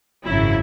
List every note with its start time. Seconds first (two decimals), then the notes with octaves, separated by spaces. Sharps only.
0.24 G#1 F#2 C#3 F#3 E4